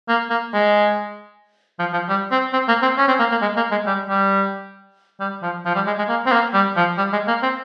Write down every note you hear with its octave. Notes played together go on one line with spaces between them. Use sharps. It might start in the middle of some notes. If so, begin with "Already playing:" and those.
A#3
A#3
G#3
F3
F3
G3
C4
C4
A#3
C4
C#4
C4
A#3
A#3
G#3
A#3
G#3
G3
G3
G3
F3
F3
G3
G#3
G#3
A#3
C4
A#3
G3
F3
G3
G#3
A#3
C4